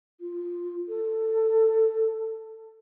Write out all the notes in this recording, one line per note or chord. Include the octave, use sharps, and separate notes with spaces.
F4
A4